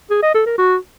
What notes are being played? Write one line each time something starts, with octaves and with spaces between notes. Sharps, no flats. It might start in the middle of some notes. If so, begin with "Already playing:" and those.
G#4
D#5
A4
A#4
F#4